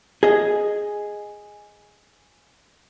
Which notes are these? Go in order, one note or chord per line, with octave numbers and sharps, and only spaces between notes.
G#4 D#5